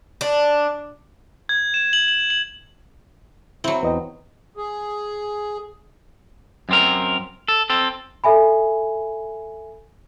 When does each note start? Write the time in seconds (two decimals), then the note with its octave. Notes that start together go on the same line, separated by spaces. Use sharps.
0.21 D4
1.49 G#6
1.74 E7
1.93 F#7
2.08 F#7
2.30 F#7
3.64 F#3 C4 E4
3.82 E2 B4 D#5 G5
4.57 G#4
6.69 F#2 C4 A#4
7.48 A4
7.70 C4 A4
8.24 A4 E5 G#5 B5